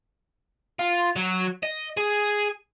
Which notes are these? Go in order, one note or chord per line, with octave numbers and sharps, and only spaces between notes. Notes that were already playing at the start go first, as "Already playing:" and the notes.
F4
F#3
D#5
G#4